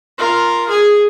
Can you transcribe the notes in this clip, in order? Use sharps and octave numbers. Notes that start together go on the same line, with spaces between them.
F4 A#4
G#4 G#5